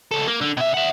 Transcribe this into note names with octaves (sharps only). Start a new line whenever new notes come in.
C#2 A4
A#3
D3
B2 E5
E5 F#5